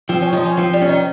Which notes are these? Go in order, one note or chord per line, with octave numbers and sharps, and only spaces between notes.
F3 C4
C#4
F3 D#4
C#4
F3 C4
G3
C#4
D#3